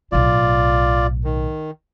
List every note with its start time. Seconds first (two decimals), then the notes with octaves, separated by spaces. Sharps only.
0.12 B1 A2 F4 D5
1.24 D#3